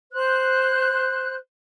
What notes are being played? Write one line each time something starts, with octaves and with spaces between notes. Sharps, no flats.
C5 F#6